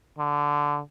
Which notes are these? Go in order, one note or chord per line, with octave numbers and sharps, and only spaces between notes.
D3